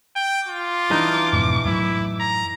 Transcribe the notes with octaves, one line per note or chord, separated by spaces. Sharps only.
G5
F4 D6
E3 D4 D#4
F2 G#2 B2
F#2 A2 F#3 E4
A#5